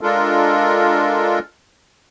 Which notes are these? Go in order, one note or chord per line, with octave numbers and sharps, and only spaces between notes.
G#3 D4 F4 A4 A#4